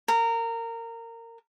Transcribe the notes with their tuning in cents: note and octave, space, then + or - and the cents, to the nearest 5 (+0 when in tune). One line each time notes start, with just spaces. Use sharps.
A#4 -20